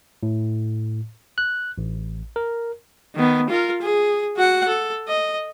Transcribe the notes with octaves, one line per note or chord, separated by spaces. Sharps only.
A2
F#6
A1
A#4
D#3 B3
F4 A#4
G#4
F#4 F#5
A4
D#5